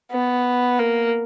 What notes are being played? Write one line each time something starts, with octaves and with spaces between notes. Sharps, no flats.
B3
A#3